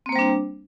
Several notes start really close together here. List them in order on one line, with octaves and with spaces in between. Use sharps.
C4 A#3 C5 G3 D4